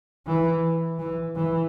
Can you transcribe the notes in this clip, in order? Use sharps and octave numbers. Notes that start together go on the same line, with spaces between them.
E3
E3
E3